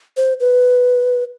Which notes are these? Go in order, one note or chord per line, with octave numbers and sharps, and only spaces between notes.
C5
B4